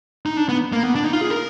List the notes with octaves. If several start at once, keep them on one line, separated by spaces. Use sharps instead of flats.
D#4
D4
B3
A#3
B3
D4
D#4
F4
G#4
A#4